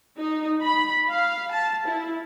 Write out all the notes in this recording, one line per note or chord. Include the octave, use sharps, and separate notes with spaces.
D#4
B5
F5
A5
E4